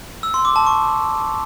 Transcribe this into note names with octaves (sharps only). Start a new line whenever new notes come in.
E6
C6
D6
A5
C#6